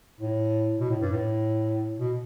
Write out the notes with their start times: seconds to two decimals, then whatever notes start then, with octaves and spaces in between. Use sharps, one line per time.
0.21 A2
0.80 B2
0.90 A2
1.01 G2
1.12 A2
1.99 B2